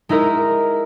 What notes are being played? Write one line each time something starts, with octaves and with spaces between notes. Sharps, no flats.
G#3 D#4 E4 A#4